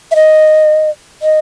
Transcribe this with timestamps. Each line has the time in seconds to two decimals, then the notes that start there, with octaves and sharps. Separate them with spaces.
0.11 E5
0.16 D#5
1.22 D#5